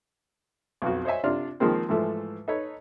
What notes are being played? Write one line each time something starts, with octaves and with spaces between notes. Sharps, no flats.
B1 F2 F#4
C5 C#5 D#5 E5 G#5
C3 D4 F4 F6
D#3 F3 G#3 A#3 C4
G#2 E3 F3 A3
D#4 A4 B4 C#5